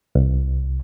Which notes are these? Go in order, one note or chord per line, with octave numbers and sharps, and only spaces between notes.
C2